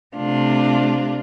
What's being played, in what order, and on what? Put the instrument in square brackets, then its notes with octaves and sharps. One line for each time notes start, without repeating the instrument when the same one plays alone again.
[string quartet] C3 A3 D4 F4